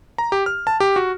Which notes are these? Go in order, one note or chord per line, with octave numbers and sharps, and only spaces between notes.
A#5
G4
F6
A5
G4
F#4